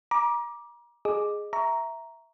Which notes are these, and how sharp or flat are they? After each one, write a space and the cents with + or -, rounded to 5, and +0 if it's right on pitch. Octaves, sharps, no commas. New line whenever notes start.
A#5 +30 D6 +0
G#4 +0 D#5 -15 D6 +0
E5 -5 A#5 +0 C#6 +20